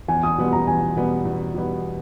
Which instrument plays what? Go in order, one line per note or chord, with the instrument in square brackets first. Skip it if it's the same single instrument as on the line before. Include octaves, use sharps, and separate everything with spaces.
[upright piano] E2 [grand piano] G#5
[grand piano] D#6
[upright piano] B2 G3 B3
[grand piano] A#5
[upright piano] E2 [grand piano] G#5
[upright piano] B2 G3 B3
E2
B2 G3 B3